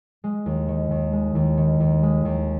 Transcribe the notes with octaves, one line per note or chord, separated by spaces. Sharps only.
G#3
D#2
D#3
D#2
G#3
D#2
D#3
D#2
G#3
D#2